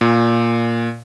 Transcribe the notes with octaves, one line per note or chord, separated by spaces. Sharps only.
A#2